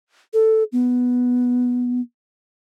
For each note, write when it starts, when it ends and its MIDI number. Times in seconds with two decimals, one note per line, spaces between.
0.33 0.63 69
0.72 2.01 59